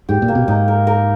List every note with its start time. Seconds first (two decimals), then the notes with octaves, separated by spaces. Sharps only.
0.09 G#2 G4
0.22 A#2
0.28 A#3
0.35 B2
0.48 G#2 D#4
0.68 A#4
0.87 A#4